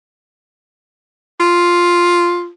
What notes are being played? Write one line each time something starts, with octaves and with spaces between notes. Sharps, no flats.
F4